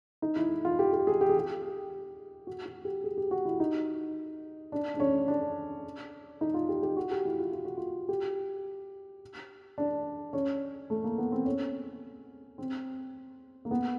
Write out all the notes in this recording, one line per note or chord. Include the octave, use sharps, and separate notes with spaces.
D#4
E4
F4
G4
G4
G#4
G4
G#4
G4
F#4
F#4
G4
G#4
G4
F#4
E4
D#4
D4
D4
C#4
D4
D#4
F4
G4
G4
F#4
G4
E4
F4
F4
F#4
F4
G4
D4
C#4
A3
A#3
B3
C4
C#4
C4
A#3
B3